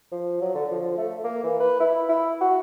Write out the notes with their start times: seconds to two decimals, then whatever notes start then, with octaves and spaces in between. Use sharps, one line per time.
0.12 F3
0.41 F#3
0.55 D3
0.71 F3
0.97 A3
1.24 A#3
1.44 E3
1.60 B4
1.80 E4
2.09 E4
2.41 F#4